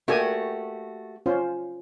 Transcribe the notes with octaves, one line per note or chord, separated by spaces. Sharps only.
A3 A#3 F#4 G4 D5 G#5
C#4 F4 C5